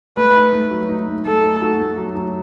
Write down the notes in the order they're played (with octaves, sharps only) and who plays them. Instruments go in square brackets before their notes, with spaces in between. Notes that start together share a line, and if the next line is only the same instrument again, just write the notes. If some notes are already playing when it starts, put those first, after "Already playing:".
[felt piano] A3 [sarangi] B4
[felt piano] D#4
A3
F#3
D#4
A3
[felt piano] A3 [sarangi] A4
[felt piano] D#4
F#4
A3
F#3
F#3